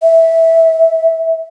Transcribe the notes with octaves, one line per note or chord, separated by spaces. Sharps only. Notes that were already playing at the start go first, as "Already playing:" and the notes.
E5